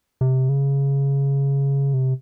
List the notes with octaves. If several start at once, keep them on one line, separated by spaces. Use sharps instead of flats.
C3
C#3
C3